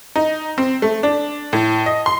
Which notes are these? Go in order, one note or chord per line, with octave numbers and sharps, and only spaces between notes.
D#4
C4
A3
D4
A2
D#5
C6